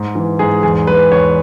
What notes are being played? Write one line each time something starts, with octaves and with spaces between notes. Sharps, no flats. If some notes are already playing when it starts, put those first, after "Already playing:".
Already playing: G#2
E3
G#2 G#4
E2 G#4
G#3 B4
E2 C#5